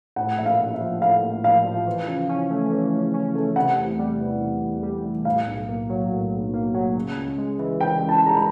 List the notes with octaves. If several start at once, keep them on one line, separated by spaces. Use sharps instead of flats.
A2 F#5
A#1 E5
F5
A#1
E5
F3
A2 F5
A#1
A#1 F5
F3
E3
C#3
C#4
A3
E3
C#3
C#4
A3
C3 F#5
E2
G3
E3
C3
E2
G3
E3
A2 F5
B1
A#3
F#3
A2
B1
A#3
F#3
C#3
C#2
G#3
E3
C#3 G5
C#2
A5
G#3 A#5
B5